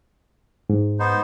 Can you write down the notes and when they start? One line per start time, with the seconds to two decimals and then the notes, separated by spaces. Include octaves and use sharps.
0.70 G#2
0.99 B3 D#4 C5